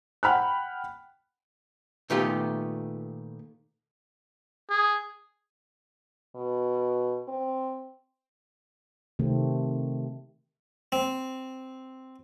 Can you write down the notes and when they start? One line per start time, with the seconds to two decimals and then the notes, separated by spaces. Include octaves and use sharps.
0.23 F#5 G5 B5 F6 F#6
2.10 A#2 D#3 A3 B3 F4 G4
4.70 G#4
6.36 B2
7.28 C4
9.19 C3 D#3 A3 C4
10.92 C4